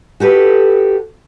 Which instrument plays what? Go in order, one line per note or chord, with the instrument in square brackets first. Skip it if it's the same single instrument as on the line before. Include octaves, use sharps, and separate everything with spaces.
[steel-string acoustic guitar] F#4 G4 A4 B4